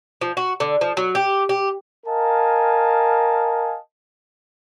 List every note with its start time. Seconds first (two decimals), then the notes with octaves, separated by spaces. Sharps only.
0.21 F3
0.37 F#4
0.60 D3
0.81 F3
0.97 F#3
1.15 G4
1.49 G4
2.06 A#4 D#5 F5 G#5 A5